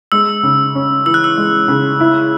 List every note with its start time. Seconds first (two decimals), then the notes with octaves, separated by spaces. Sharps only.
0.12 G#3 E6
0.43 C#3
0.75 C#4
1.06 E3 E6
1.14 F#6
1.24 E6
1.37 G#3
1.68 C#3
2.00 E4